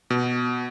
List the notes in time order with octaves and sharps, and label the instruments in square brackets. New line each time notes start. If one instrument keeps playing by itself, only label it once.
[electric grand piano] B2